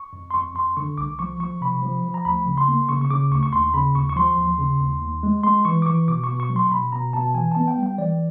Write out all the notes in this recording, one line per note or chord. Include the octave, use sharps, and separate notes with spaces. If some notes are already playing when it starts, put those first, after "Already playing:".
Already playing: C#6
F2
C6
F2 C#6
F2 C6
D3 C#6
C2 D6
F3 C#6
F3 C#6
C3 B5
F3
F3
A#5
D2 B5
C#3
C6
A#3
C#3 C#6
C#6
C#3 D6
D2 C#6
C#6
D#2 C6
C#3 B5
D#2 C#6
C#6
F3 C6
D#2
C#3
D#2
D#2
G#3
G#3 C6
E3 C#6
D6
E3 C#6
B2 D6
C#6
B2
C#6
F#3
C6
B2 B5
B2 A#5
B2 A5
E3 G#5
B3 A5
G5
G3
G5
E3 D5